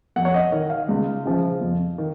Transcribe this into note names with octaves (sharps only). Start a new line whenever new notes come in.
F2 F#5
C#5
D#5
D#3
F5
C#2
C#3 F3
F2
D#3